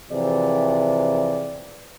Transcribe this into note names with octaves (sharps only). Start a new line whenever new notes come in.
C3 E3 F3 G#4 D5